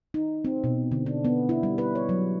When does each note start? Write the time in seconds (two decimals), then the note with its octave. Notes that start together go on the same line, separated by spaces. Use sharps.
0.14 D#4
0.45 C4
0.64 B2
0.92 D3
1.06 D4
1.25 B3
1.49 E4
1.63 G3
1.78 B4
1.95 C#5
2.09 F#3